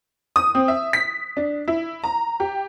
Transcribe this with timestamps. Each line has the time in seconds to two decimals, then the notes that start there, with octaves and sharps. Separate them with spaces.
0.36 D#6
0.55 C4
0.68 E5
0.93 B6
1.37 D4
1.68 E4
2.04 A#5
2.40 G4